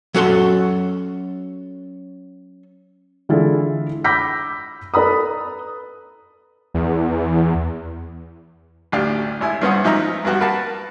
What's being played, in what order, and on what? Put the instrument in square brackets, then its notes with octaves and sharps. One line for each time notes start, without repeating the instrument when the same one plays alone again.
[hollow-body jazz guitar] F#3 C#4 F#4 A4 B5 C6
[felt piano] D3 E3 G#3 E4 F4 A4
B5 D6 E6 G6 A#6 B6
A4 B4 A#5 B5 D#6
[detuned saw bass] E2
[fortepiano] A1 D2 D4 G4 F5
G#1 E4 G#5
G2 B3 C#4 C5 F#5 D#6
G#2 F3 D#4 E5 A#5
G2 B3 F#4 G4
A#4 B4 F5 F#5 A5